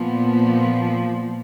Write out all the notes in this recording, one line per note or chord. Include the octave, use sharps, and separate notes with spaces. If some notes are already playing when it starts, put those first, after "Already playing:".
Already playing: A#2 F3 B3